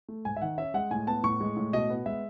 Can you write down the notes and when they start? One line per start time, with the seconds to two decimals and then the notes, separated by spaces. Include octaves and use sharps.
0.08 A3
0.25 G#2 G#5
0.37 E5
0.41 D#3 F#5
0.58 C#4 E5
0.74 G#3 F#5
0.91 A2 G#5
1.07 B3 A5
1.24 A2 C#6
1.41 G#3
1.57 A2
1.73 B2 D#5
1.90 B3
2.06 G#3 E5